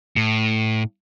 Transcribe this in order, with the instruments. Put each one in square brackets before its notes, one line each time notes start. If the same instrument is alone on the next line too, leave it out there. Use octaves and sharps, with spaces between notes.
[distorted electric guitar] A2